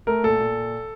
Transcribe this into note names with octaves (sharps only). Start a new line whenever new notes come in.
A3 A#4
A#2 A4
A#2